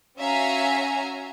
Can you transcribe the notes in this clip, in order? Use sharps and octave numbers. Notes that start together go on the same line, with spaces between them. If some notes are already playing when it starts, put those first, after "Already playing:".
C#4 F#4 E5 F5 G#5 A#5